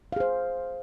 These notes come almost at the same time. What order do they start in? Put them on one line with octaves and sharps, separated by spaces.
F5 G#4 C5